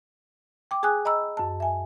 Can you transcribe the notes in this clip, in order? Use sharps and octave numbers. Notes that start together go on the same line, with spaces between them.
G5 D6
G#4 G#5 D#6 F#6
D#5 A#5 B5 E6
F#2 A5
E5 G#5